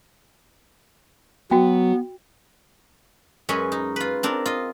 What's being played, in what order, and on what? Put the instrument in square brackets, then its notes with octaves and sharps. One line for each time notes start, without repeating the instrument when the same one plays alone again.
[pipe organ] F#3 [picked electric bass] B3 [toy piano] F#4 G5
[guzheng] F#2 G#3 C#4 B4 G#5
D#4
F4 B4
C4 D4 A#4
F4 D#5